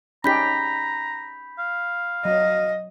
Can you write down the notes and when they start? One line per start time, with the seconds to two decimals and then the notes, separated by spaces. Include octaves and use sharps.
0.24 C#4 D#4 G4 A#5 B5 G6 B6
1.59 F5
2.25 F#3 D#5